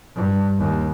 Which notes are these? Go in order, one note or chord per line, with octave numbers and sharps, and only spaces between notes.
G2
D#2